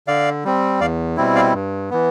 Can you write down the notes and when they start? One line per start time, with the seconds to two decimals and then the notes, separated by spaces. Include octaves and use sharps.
0.07 D3 D5 F5
0.44 G3 C4
0.81 E2 D5 F5
1.17 B2 G3 C4 E4
1.35 D5 F5
1.53 G2
1.90 E3 B3